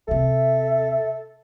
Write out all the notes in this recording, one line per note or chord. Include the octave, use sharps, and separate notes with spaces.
D#2 C3 A4 E5